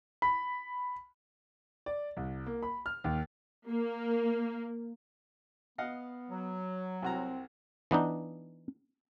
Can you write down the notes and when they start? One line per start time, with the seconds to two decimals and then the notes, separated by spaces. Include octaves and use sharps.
0.22 B5
1.86 D5
2.17 C2
2.46 A#3
2.62 B5
2.86 F6
3.04 D#2
3.69 A#3
5.78 B3 D#5 F5 F#5
6.30 F#3
7.02 C2 C4 F#4 A#5
7.91 E3 B3 D4 D#4